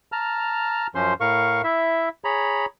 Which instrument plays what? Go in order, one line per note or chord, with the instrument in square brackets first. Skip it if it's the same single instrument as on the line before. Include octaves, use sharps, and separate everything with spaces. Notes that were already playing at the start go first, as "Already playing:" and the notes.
[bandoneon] A5 A#5 F6
F#2 F3 C#4 C5 C6
A2 A#4 F5 C#6
E4 E5
G#4 C#5 A#5 B5